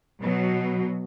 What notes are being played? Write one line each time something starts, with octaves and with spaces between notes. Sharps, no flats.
B2 F#3